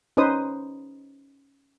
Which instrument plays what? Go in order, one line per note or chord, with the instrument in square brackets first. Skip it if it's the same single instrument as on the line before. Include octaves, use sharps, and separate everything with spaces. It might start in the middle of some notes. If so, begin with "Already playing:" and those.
[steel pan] C#4 D#4 B4 C5 D#6